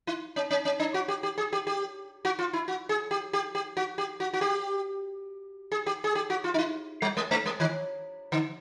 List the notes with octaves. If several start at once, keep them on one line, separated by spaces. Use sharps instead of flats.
E4
C#4
C#4
C#4
D4
F#4
G4
G4
G#4
G4
G4
F#4
F4
E4
F#4
G#4
G4
G4
G4
F#4
G4
F#4
F#4
G4
G#4
G4
G#4
G4
F#4
F4
D#4
E4
G3
G#3
A3
G#3
D#3
D3